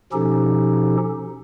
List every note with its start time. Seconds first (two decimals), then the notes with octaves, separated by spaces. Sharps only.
0.13 B2 F3 C#4 D#4 G4 A4